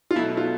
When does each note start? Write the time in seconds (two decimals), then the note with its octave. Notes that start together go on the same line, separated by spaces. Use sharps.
0.11 F4
0.16 B2 F#3 A3 E4
0.37 F4